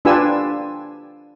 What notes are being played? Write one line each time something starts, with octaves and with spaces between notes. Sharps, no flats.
D4 F4 G4 B4 G#5 E6